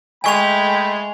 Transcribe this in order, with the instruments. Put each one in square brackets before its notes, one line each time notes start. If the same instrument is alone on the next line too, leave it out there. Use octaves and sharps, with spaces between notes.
[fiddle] G#3 [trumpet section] A3 G5 B5 [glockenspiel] G#5 C#6 F7